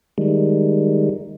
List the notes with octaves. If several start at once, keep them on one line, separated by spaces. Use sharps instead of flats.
D#3 G3 G#3